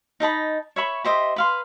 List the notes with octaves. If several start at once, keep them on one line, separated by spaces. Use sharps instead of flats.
D#4 D#5 A5 B5
C#5 E5 B5 C#6
G4 C5 D#5 E5
B4 F5 C6